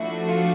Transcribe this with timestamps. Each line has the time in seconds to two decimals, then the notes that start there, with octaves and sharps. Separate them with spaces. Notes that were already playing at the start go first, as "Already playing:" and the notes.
Already playing: F3 A3 D4 E4 F#4
0.29 F4